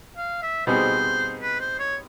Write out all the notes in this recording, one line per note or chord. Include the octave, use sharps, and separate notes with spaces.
F5
E5
B2 G3 C4 D#4 G#4 C5
B4
C5
C#5